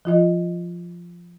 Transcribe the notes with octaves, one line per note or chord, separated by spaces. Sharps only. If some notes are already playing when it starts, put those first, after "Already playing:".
F3 F4 D#5